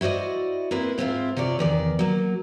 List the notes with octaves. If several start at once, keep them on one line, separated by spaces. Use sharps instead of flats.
E4 F#4 C5 D5 D#5
A#3 C4 E4 B4 C5
G#2 C4 C#4 E4 F4
C3 F4 C#5 D5
E2 D#3 D5
F#3 A#3